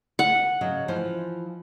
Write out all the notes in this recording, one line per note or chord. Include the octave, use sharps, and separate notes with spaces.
F#5
C#3 F#3 D#5
E3 F3 C5